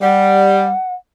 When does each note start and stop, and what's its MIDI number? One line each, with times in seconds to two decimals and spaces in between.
0.01 0.70 55
0.01 0.94 78